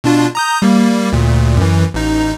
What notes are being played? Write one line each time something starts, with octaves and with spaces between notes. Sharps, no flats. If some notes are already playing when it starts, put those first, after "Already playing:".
B2 D4 F4
A#5 D#6 G6
G3 A#3
D2 A#2
F#2 E3
A1 D#4